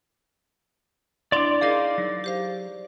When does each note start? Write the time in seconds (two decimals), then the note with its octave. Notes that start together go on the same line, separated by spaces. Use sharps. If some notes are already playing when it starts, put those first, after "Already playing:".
1.32 D4 E4 D5 C6 D6
1.61 D#4 G#4 A#4 D#5 F5
1.98 F#3
2.24 G4 C5 F5